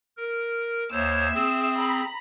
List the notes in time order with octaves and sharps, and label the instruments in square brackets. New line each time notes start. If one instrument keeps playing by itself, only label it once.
[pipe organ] A#4
[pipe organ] D#2 C5 C#5 [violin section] E5 E6
[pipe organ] C4 G#4
[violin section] A#5 B5